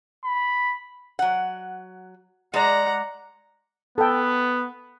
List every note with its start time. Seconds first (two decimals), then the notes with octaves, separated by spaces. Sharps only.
0.24 B5
1.19 F#3 F#5
2.54 G#3 D5 F#5 A#5
3.98 B3 A4 G5